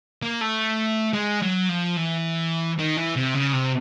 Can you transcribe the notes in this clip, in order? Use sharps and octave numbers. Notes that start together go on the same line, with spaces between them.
A#3
A3
G#3
F#3
F3
E3
D#3
E3
C3
C#3
C3